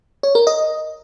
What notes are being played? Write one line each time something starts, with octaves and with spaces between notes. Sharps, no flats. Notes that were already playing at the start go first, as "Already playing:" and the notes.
C#5
A#4
D#5